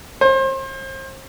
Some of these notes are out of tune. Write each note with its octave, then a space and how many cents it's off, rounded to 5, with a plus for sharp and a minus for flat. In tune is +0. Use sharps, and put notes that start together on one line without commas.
C5 +35